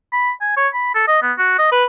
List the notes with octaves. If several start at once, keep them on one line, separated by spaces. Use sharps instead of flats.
B5
G#5
C#5
B5
A4
D#5
B3
F#4
D#5
B4